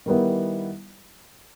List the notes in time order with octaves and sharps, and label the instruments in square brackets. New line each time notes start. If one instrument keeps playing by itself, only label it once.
[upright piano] D#3 G3 B3 E4